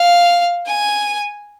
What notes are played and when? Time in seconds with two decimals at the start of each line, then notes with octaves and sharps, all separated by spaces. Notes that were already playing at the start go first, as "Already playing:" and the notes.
Already playing: F5
0.66 G#5